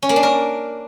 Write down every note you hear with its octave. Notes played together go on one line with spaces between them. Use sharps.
C#4
A#3
D4
A#4